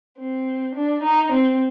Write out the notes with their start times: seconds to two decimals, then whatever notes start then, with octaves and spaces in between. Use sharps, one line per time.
0.18 C4
0.75 D4
1.03 D#4
1.31 C4